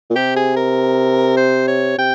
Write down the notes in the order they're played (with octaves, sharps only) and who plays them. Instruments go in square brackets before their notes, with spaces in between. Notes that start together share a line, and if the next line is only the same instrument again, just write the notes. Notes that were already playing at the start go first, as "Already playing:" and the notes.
[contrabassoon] A#2
[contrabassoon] C3 [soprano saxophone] G4
[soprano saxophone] G#4
A#4
C5
C#5
[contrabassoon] C3 [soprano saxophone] G5